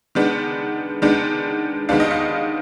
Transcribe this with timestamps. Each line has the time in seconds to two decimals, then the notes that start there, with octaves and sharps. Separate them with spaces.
0.15 D#3 G#3 B3 D4
1.02 D#3 G#3 B3 D4
1.89 D#3 G#3 B3 D4 F5
2.00 D#5
2.11 F5